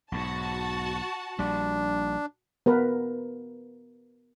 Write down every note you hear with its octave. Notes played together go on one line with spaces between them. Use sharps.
B1 G#2 F#4 A5
A#1 G3 D4
B3 A#4 B4